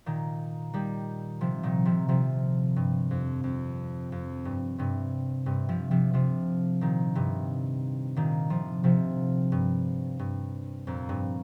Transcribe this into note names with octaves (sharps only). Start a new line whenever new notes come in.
A#2 D#3
D#3 G3
C3 F3
A#2 D#3
C3 F3
C3 F3
G2
F2
F2
F2
G2
G2 C3
G2 C3
C3 F3
C3 F3
C3 F3
A#2 D#3
G2 C3
A#2 D#3
C3 F3
C3 F3
G2
G2
F2 A#2
G2